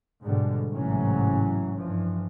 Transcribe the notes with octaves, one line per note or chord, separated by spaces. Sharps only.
G#2 B2 D3 G3
A1 G#2 C3 E3 F#3 C#4
G2 E3 F3